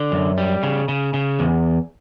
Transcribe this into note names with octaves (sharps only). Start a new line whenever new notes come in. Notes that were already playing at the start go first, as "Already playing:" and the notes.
Already playing: D3
F#2
G3
C#3
C#3
C#3
E2